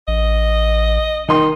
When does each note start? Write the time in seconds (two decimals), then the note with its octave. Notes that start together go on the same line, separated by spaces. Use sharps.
0.08 A1 D#5
1.28 D#3 D#4 C6